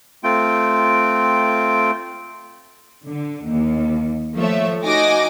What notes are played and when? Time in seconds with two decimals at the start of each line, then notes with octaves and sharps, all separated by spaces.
0.24 A3 C4 F4 G5
3.07 D3
3.48 D#2
4.36 F3 A3 C#5 E5
4.84 D#4 F#4 G#5 D6 A#6